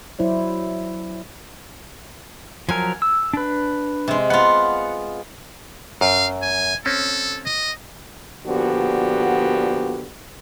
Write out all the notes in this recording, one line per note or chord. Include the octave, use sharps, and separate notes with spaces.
F#3 E4 C5 D5
F3 F#3 A#4 G#5
E6
D4 B4
C3 G#3
B3 F4 F#5
F#2 F5
G#5
C4 C#4 A4
D#5
A#2 D3 F3 B3 F#4 G4